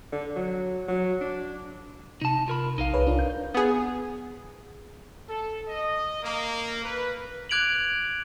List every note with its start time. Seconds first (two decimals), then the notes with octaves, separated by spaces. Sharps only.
0.13 D3
0.36 F#3
0.88 F#3
1.21 D4
2.21 C3 D#4 A5
2.48 F4 A#4 B5
2.78 A#1 D#4 A#4 F5
2.93 C2 G#4 B4 C#5
3.06 D4 F4
3.19 G6
3.54 B3 G#4
5.28 A4
5.67 D#5
6.22 A#3
6.84 B4
7.49 D6 F#6 G#6 D7 F7 F#7